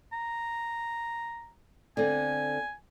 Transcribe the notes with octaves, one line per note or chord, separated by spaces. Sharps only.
A#5
D3 C4 G#5